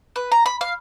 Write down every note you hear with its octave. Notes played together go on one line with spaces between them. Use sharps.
B4
A#5
B5
F5